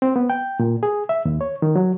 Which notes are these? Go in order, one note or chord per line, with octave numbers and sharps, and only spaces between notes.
C4
B3
G5
A#2
G#4
E5
D#2
C#5
D#3
F#3